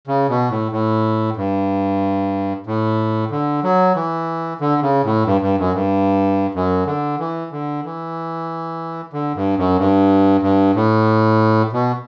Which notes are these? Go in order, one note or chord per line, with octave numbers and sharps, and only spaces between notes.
C#3
B2
A2
A2
G2
A2
D3
F#3
E3
D3
C#3
A2
G2
G2
F#2
G2
F#2
D3
E3
D3
E3
D3
G2
F#2
G2
G2
A2
B2